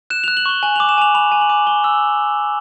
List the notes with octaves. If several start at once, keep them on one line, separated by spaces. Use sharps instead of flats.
F#6 E7
F#6 F7
F#7
C#6 G7
G#5 F#7
D6 F7
E7
G#5 F7
B5 F7
G#5
F#7
D6
G#5 G7
E6